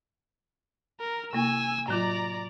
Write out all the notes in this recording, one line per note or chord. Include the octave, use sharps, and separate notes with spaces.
A#4
C3 A#3 E4 G#5 E6
A2 F#3 F4 D5 A#5